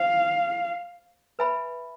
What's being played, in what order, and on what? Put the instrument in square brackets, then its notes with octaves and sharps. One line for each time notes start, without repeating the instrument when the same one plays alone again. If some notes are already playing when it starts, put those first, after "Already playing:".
Already playing: [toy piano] C5 [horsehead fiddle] F5
[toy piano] B4 E5 G#5 B5